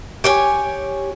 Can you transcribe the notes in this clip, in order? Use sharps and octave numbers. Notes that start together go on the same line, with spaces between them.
G4 C#5 G#5